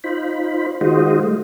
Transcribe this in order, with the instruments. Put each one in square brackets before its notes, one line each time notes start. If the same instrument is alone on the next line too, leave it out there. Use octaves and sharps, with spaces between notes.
[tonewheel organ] D#4 F4 C5 B5
D#3 G#3 F4 F#4 C5 D#5
G3 A3